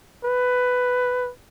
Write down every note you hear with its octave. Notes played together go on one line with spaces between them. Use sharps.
B4